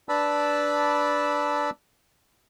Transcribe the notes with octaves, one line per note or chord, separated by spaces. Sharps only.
D4 B4 D5 A5 B5 E6